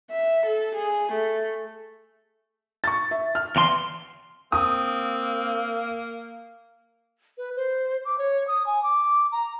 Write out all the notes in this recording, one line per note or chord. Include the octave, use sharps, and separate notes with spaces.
E5
A4
G#4
A3
C#6 A6
E5
F6
E2 C6
A#3 C4 D#6
B4
C5
D6
C#5
D#6
G#5
D6
A#5